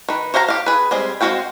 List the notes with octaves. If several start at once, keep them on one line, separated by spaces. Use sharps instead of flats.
D#3 B4
F#4 C5 F5 G5 A#5
G4 F5
G#4 B4
G3 G#3 C4 G#4
G#3 C4 F#4 F5 G5